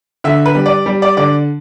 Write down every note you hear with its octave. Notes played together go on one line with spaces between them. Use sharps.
D3 E5
B4
G3
D5
G3
D5
D3 D5